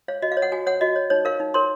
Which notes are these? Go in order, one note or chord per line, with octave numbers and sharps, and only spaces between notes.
C#5 F5
F#4 D#5
F5
C#5
F#5
F#4 G#5
C#5 F#5
F#4 D#5
C#5
D#4 C#5
A#4 C#5 F5
D#4
A#4 C#5 C6